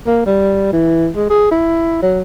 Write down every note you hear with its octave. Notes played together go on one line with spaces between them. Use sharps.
A#3
G3
E3
G#3
G#4
E4
F#3